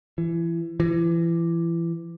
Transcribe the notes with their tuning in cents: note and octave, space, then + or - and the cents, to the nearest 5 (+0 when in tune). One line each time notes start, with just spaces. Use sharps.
E3 +25
E3 +30